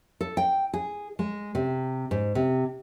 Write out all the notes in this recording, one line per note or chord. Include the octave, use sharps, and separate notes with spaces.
A4
G5
G#4
G#3
C3
G#2
C3